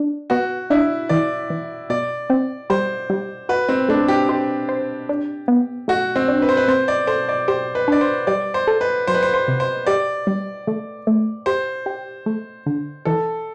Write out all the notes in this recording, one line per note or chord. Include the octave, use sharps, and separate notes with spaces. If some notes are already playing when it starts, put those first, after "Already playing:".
Already playing: D4
B3 F#4
D4 E4
E3 D5
E3
B2 D5
C4
G3 C5
G3
F#4 B4
C4
A3 D4
G4
G4 C5
C5
D4
B3
A3 F#4
C4
D4
B4
C5
B4
C4 C5
D5
A4 C5
D5
G4 C5
B4
D4 D5
C5
G3 D5
C5
A4
B4
F#3 C5
B4
C5
C5
C3
C5
G4 D5
G3
A3
A3
G4 C5
G4
A3
D3
E3 A4